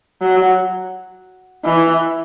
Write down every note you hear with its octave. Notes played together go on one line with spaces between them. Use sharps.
F#3
E3